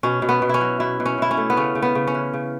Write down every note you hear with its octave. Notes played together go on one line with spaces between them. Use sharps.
B2 C#4
B2
B3
B2
C#4 E4
F#3
B2 E4
B2
C#4
B2 E4
C#4
A3
B3
C#3 C#4
C#3
B3
C#3
C#4
E3
C#3